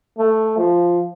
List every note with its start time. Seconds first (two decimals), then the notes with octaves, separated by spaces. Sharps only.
0.19 A3
0.58 F3